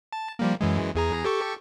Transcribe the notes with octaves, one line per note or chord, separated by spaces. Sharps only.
A5
F3 G3 A#3
F#2 E3 G#3
E2 G#4 A#5
G4 A4 C#6